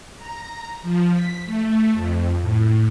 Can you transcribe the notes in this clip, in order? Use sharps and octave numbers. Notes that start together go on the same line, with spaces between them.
A#5
F3
B6
A3
F2
A2